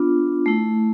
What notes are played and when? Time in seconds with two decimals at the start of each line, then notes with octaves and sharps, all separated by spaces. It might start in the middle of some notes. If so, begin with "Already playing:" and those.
Already playing: B3 D4 F4
0.46 A3 E4